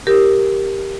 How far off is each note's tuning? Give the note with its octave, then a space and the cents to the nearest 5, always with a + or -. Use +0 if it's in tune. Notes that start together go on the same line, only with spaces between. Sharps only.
G4 +0 A#4 +0